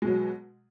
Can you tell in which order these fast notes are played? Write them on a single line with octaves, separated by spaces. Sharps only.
G#3 B2 F#3